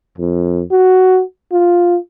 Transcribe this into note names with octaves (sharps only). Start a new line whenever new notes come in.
F2
F#4
F4